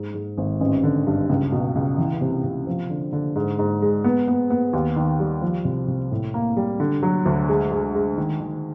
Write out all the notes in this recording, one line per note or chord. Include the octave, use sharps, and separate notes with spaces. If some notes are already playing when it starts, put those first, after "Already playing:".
Already playing: G#2
G#2
G#1
A1
D3
G2
C#2
B2
C#2
E3
C3
C3
F3
D3
D3
G#2
G#2
G#3
B3
B3
B3
D#2
D#3
G3
F3
C2
C2
A2
A#3
G3
D3
F#3
D2
G#3
G#3
G#3
D#3
D#3